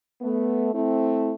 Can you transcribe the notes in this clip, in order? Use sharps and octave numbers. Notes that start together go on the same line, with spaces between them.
A3 B3
A3 C4 E4